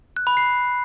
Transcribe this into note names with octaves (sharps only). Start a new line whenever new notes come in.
F#6
B5
C7